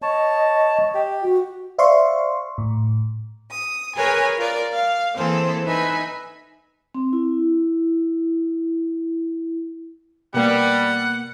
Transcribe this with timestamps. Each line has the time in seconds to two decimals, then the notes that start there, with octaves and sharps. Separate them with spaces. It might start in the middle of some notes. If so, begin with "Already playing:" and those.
0.02 C#5 D#5 A5
0.95 G4
1.23 F#4
1.78 C5 D5 E5 F5 C6 C#6
2.58 A2
3.50 D#6
3.96 G#4 A#4 B4 C#5 G#5
4.37 F4 A#4 D5
4.73 F5
5.17 E3 A#3 C4 G#4 A4 C5
5.66 D#4 B4 E5 G#5 B5
6.95 C4
7.13 E4
10.34 B2 G3 A#3 B3 F#5